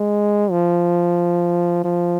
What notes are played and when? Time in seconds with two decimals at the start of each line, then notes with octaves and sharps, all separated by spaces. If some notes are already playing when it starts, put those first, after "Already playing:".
Already playing: G#3
0.51 F3
1.84 F3